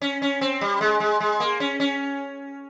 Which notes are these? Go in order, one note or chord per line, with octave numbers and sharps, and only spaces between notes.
C#4
C#4
C4
G3
G#3
G#3
G#3
A#3
C#4
C#4